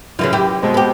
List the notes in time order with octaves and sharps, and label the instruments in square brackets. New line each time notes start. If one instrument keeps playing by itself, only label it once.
[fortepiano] F#2 [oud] C#3 E3 F4
[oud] E4 G4
[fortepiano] B2 G#3 C4
[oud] B3 G4